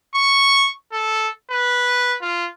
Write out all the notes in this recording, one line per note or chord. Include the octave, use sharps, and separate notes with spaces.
C#6
A4
B4
F4